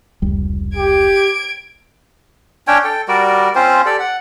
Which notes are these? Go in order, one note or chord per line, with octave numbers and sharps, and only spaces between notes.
F1 C#2 G3
G4 G#6 D7
C#4 D4 C#5 G5
A4 G5
G3 F#4 A#4 D5
C4 C#4 F4 C5
G4 A4 D5
F#5